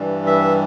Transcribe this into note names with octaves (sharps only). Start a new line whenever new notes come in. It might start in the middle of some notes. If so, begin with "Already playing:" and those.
Already playing: G2 E3 G3
E5